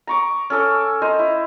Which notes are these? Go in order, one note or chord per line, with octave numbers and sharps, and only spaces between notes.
A#5 C#6 D6
C#4 A4 D6
C5 D#5 A#5
E4